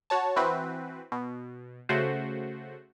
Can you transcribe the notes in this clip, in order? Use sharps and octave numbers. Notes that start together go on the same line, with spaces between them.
F#4 C#5 A5
E3 C4 F#4 B4
B2
C#3 A3 F#4 C5